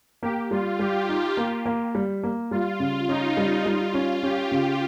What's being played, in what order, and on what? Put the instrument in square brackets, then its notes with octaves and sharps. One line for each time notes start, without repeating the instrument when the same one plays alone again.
[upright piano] A#3 [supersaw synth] G4
[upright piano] G3 [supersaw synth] F4
[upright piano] G3 [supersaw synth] G4
[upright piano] D#4
A#3
A#3
G3
A#3
[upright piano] G3 [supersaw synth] F4
[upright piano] C#3
[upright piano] C#4 [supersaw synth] D#4
[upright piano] G3
[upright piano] G3 [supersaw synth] F4
[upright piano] C#4
[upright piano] C#4 [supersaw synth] G4
[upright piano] C#3